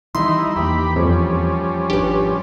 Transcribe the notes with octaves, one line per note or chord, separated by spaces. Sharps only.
D#3 E3 G3 D#4 E4 C6
E2 E3 A#3 G4 B5
F2 F3 G3 C#4
G#1 D4 G4 B4